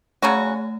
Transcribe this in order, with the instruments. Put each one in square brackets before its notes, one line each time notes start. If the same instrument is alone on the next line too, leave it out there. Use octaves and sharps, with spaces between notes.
[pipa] C#3 F#3 C#4 F#4 [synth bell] A3